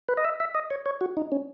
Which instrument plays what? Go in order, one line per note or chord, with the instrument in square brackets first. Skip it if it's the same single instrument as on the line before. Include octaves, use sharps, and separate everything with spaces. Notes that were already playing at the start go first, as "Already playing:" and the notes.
[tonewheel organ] B4
D#5
E5
E5
D#5
C#5
C#5
F#4
D#4
C#4